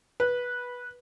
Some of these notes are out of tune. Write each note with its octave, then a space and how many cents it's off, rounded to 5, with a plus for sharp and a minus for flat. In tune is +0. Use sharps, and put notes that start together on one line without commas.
B4 -10